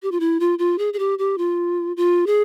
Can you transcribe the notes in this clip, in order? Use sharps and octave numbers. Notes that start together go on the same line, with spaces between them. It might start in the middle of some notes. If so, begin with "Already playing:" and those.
G4
F4
E4
F4
F4
G#4
G#4
G4
G4
F4
F4
G#4